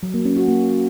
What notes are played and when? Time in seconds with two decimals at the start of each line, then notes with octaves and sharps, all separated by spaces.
0.03 F#3
0.14 A#3
0.25 C#4
0.37 F#4
0.48 A#3